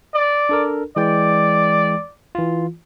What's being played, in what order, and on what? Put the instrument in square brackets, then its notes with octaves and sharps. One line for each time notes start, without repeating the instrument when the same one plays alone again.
[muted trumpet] D5
[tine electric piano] D4 A4 A#4
[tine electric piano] E3 G#3 G5 [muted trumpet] D5
[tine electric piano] E3 F4